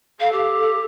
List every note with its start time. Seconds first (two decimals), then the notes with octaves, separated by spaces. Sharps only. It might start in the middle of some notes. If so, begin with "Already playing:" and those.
0.20 A4 F5
0.32 G4